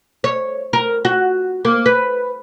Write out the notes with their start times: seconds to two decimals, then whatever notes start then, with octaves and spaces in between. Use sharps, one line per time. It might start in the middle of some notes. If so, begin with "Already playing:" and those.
0.24 C#5
0.73 A#4
1.05 F#4
1.65 A#3
1.86 B4